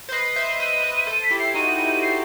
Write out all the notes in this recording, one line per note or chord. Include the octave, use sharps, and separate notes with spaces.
C5
B4 D#5 C7
C5 E5
C5 E5 D#7
B4 D#5
A4 C5 D#7
B6
E4 G4
C7
D#4 F#4 D#7
E4
C7